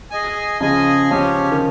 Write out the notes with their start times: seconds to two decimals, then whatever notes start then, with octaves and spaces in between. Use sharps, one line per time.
0.11 G#4 D#5 G#5
0.61 C#3 F3 G#4 D#5 G#5
1.10 C#3 F3 C#4 G4 C#5
1.51 D#3